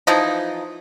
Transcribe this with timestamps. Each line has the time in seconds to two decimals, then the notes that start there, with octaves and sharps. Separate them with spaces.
0.07 E3 F3 D#4